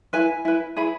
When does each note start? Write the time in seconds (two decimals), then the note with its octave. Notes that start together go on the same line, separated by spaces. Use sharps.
0.13 E4 B4 G#5
0.45 E4 B4
0.76 E4 G#4 B4 B5